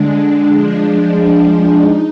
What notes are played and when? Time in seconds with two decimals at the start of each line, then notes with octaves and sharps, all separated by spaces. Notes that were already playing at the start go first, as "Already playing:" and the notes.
Already playing: D3 G#3 D4
0.52 F3 G#3 D4
1.80 D#4